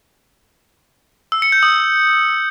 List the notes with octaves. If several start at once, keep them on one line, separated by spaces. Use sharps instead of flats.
E6
C#7
G6
D#6